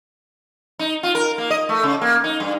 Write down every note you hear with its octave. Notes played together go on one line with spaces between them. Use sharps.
D#4
F4
A#4
A#3
D#5
A3
C#3
A#3
D#4
G2